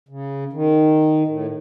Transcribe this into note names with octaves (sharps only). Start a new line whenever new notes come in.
C#3
D#3
A2